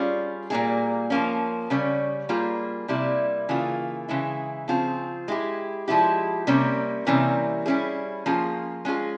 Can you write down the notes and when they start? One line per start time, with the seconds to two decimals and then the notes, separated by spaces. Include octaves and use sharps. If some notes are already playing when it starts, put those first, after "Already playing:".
Already playing: G3 C#4 F4 G#4
0.50 A#2 G3 A#3 E4 G#4
1.10 F3 A#3 C#4
1.70 C#3 G3 C#4
2.29 G3 A#3 F4 G#4
2.88 C3 G3 A#3 E4
3.49 C#3 E3 A#3 F4 G#4
4.08 C#3 E3 G#3 E4
4.68 C#3 F3 C4 F4 G#4
5.28 G#3 E4 G4
5.88 F3 G#3 E4 G4
6.47 C3 G3 A#3 C#4
7.07 C3 E3 G3 A#3 C#4
7.66 G3 C#4 E4 G#4
8.26 F3 A#3 C#4 F4 G#4
8.85 G#3 C#4 F4 G#4